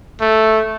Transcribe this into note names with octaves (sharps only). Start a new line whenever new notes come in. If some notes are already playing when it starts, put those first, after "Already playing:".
A3